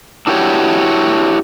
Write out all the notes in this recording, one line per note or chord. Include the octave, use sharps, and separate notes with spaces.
D4 E4 F#4 G4 A4 C#5